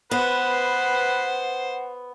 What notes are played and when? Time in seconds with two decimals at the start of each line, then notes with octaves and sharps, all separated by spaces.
0.11 B3 B4 C5 F#5